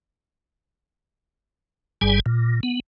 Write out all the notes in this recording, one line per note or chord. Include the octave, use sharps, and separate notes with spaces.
G1 G2 G3 G#4 G#5
A#2
B3